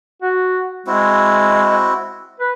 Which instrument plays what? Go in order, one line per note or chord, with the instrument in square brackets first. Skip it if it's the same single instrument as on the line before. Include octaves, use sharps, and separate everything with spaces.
[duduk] F#4
[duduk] G#3 [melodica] C4 E4 F#4
[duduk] B4